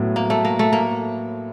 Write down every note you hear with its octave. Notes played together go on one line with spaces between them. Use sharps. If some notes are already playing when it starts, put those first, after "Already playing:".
Already playing: A2 F#3 B3
A#3
A3
A#3
A3
A#3